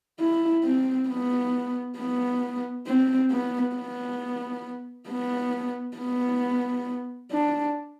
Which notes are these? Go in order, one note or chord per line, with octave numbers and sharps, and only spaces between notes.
E4
C4
B3
B3
C4
B3
B3
B3
B3
D4